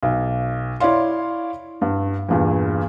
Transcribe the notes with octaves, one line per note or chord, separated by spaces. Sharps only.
B1
E4 C#5 D5 F5 C6
G2
E2 G2 A#2